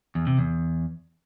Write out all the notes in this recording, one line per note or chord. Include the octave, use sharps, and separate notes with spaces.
E2
C3
E2